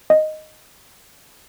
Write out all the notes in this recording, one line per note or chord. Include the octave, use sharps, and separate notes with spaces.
D#5